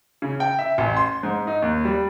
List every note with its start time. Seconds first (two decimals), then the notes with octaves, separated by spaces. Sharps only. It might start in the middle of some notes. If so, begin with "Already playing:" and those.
0.22 C#3
0.40 G5
0.59 E5
0.78 A1
0.97 C6
1.23 G#2
1.47 D#4
1.62 D#2
1.85 G3